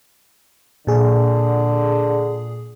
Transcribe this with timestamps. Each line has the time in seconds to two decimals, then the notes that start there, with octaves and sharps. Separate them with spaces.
0.87 A#2 D3 G#4